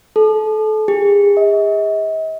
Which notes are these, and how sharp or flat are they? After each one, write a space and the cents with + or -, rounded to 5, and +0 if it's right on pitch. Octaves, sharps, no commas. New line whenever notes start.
A4 -30
G#4 -40
D#5 +45